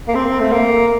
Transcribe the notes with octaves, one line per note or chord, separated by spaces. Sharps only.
A#3
C4
A3
A#3